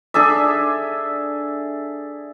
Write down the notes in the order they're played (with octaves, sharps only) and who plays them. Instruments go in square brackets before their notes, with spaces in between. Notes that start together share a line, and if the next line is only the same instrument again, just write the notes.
[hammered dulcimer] D4 G#4 A4 E5